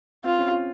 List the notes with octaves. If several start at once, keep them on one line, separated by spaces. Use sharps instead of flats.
C4 F4
C#4
F4